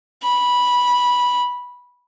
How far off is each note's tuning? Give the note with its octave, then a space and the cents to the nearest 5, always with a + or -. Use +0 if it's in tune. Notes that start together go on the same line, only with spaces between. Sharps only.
B5 -10